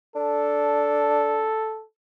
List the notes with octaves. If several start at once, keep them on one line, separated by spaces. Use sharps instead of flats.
D4 A4